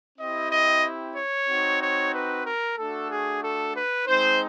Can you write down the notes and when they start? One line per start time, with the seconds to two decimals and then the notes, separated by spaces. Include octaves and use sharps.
0.18 C4 E4 G4 D#5
0.50 D#5
1.15 C#5
1.48 C4 D#4 F#4
1.80 C#5
2.13 B4
2.45 A#4
2.77 A3 D4 F#4 A4
3.10 G#4
3.42 A4
3.75 B4
4.07 G#3 C4 D#4 C5